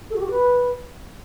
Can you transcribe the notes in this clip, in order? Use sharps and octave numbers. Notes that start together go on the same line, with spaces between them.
A4
F#4
G4
F#4
B4